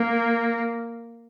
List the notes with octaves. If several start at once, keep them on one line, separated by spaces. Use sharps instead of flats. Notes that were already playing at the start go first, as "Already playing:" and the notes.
Already playing: A#3